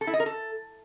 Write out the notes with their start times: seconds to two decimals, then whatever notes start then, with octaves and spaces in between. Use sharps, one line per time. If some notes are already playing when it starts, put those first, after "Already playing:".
0.01 A4
0.07 E4
0.13 D#5
0.20 A#4
0.26 A4